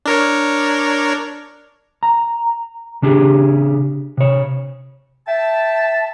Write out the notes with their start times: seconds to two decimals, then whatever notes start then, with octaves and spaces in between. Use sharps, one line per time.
0.06 D4 A#4 C#5
2.03 A#5
3.02 C#3 D4 G4 G#4
4.17 C3 C#5
5.28 E5 G5 A5